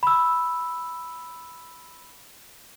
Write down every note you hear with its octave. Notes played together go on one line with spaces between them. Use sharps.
B5 E6